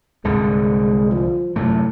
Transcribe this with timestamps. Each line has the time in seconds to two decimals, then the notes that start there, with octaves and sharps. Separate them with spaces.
0.25 C2 G#2 D3 G#3
1.11 F3
1.56 F#2 A2 C3 A3